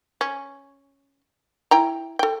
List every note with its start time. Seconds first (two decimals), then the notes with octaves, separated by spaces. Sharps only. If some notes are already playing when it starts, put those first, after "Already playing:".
0.21 C#4
1.71 E4 G5 A#5
2.19 A4 G5